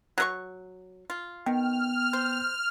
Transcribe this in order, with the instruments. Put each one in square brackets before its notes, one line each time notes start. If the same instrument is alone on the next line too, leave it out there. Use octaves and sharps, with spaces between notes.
[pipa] F#3 A#4 C#6
F4
[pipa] D#3 [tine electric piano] B3 G5 [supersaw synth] F6
[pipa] C5